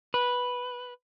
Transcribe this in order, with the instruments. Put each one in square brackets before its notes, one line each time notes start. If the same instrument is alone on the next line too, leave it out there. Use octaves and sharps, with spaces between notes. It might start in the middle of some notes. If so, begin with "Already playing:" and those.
[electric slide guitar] B4